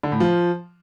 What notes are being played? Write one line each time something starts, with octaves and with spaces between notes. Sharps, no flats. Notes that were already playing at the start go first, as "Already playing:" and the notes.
D3
A2
F3